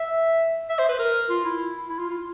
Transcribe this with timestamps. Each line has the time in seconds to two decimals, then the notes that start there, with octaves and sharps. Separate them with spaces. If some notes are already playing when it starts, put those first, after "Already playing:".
Already playing: E5
0.69 E5
0.79 C5
0.89 B4
0.99 A#4
1.29 F4
1.45 E4
1.89 E4
1.99 F4
2.09 F4